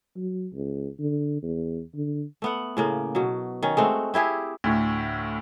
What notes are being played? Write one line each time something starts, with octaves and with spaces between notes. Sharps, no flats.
F#3
C#2
D3
E2
D3
A3 B3 F#5
A2 C#3 A#3
B2 F#3
D#3 C#4
G#3 A3 C4 F#4
C4 E4 G4 G#4
D2 A2